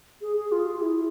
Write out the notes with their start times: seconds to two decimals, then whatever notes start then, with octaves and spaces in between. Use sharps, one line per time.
0.21 G#4
0.37 G#4
0.52 F4
0.66 G#4
0.82 E4